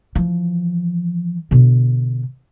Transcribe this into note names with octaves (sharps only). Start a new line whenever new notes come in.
E3 F3
B2 D3